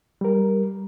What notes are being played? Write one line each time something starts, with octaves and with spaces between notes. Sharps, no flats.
G3 A#4